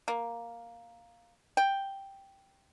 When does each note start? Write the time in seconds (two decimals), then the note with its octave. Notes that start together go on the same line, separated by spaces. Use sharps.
0.08 A#3
1.57 G5